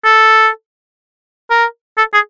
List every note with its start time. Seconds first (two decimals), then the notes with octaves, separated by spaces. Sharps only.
0.04 A4
1.50 A#4
1.98 A4
2.14 G#4